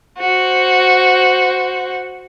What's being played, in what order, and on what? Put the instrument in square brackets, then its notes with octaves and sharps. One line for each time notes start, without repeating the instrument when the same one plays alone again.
[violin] F#4 C5